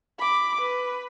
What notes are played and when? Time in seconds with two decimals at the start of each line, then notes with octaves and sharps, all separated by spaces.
0.19 B5 D6
0.61 B4